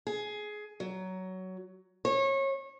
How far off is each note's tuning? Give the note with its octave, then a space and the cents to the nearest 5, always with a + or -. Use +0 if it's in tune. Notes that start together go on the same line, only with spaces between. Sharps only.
G#4 +15
F#3 +15
C#5 -30